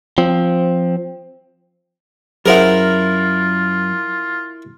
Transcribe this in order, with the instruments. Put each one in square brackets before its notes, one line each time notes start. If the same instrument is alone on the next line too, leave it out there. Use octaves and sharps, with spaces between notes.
[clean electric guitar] F3 C4
[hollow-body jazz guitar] F#2 [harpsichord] E4 A#4 [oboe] F4 [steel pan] G#4 C5 F#5